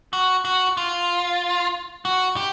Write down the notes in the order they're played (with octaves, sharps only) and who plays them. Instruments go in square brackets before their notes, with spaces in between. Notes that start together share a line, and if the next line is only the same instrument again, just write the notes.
[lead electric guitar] F#4
F#4
F4
F#4
G4